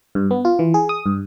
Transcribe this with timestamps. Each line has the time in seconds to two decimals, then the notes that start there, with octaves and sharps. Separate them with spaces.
0.15 G2
0.31 B3
0.45 F4
0.59 E3
0.74 G#4
0.89 D#6
1.06 G2